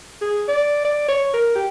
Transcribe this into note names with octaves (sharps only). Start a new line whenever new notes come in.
G#4
D5
D5
C#5
A#4
G4